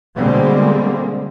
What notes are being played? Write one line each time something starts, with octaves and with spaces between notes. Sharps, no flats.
B2 D3 G3 G#3 A#3 C4